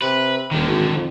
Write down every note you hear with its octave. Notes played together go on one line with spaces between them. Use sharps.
C3 B4
D#1 D3 D#3
G#1
F2